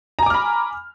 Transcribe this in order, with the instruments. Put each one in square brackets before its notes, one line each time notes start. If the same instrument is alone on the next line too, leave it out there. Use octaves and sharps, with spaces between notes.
[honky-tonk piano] A#5
G#5
D6
F6
B5